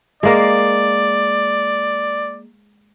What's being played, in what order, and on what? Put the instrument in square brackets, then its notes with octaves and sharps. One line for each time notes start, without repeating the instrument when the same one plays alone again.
[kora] G#3 A#3 F5 [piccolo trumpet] D5